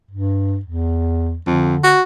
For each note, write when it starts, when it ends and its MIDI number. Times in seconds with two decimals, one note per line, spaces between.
0.11 0.59 43
0.66 1.38 40
1.47 1.76 41
1.47 1.94 50
1.83 2.02 66